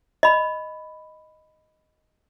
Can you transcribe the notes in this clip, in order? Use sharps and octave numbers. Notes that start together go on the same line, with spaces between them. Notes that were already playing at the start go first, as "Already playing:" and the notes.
D#5 B5